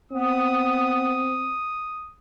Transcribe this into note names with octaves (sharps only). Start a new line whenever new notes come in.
B3 C4 D#6